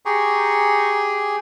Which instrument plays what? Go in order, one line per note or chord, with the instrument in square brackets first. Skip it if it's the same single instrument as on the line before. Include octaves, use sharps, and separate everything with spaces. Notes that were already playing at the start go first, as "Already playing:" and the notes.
[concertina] G4 G#4 [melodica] A#5 C#6